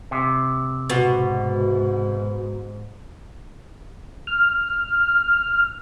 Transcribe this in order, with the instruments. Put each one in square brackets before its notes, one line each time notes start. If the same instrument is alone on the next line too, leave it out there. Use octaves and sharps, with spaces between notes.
[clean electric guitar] C3
[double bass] G#2 [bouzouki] B2 [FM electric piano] B3 F#4
[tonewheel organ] F6